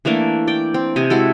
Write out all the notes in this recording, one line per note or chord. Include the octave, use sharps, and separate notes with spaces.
E3 A3 A#3 D4
D5 G5
C4
C3 D#5 G#5
G#3 E4 F#4 A4